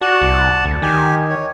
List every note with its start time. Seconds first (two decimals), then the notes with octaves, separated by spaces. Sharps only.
0.01 F#4 D5 F#5 A5
0.22 C2
0.65 D2
0.82 D#3 G4 G#5
1.30 C#5